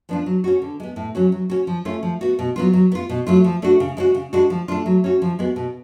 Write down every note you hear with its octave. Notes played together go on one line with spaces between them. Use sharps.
F3 B3 D4 F4
F#3
C#4 F#4
D3
G#3 B3
A2
F#3 C#4 F#4
F#3
C#4 F#4
F3
A3 C#4 F4
F3
B3 F#4
B2
F#3 B3 F4
F#3
B3 F4
B2
F#3 A3 F4
F3
A3 D4 F#4
C#3
G#3 C#4 F#4
C#3
G#3 D4 F#4
F3
A3 D4 F4
F#3
C#4 F#4
F3
G#3 B3 F#4
B2